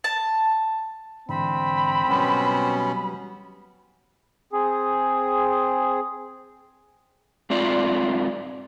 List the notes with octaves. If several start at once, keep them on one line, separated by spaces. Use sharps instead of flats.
A5
G#2 D3 E3 C4 B5
B2 F#3 G3 B3 C#4
C4 G#4
G#2 C4 F4 D5